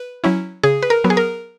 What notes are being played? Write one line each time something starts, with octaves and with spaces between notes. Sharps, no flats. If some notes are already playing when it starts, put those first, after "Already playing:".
Already playing: B4
F#3 C#4 E4
C#3 G#4
B4
A#4
F#3 B3
G#4
A#4